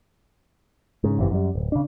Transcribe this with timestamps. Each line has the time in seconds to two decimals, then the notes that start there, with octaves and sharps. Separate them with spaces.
1.04 G#2 C#3
1.19 G1 F#2 C3 E3
1.31 F#2 G3
1.55 D1
1.72 C#3 D4